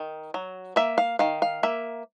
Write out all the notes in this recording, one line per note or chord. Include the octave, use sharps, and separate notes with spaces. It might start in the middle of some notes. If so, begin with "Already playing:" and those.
Already playing: D#3
F#3
A#3 E5
F5
D#3 F5
F5
A#3 E5